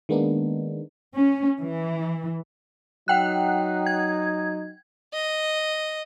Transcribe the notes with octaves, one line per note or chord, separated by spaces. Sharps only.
D#3 G#3 A#3 B3 D4 D#4
C#4
E3
F#3 D#4 F#5 G5 F#6
G#6
D#5